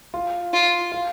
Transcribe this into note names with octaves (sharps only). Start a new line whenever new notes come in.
F4
F4
F4